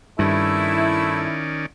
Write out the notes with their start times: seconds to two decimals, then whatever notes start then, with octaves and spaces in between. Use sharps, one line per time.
0.19 G2 D#3 A3 C#4 E4 D5